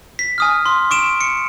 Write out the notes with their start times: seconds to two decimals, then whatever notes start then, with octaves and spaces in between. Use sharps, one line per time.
0.19 B6
0.38 G#5 D#6 F6
0.66 C6
0.91 C#6 D7 E7
1.21 C#7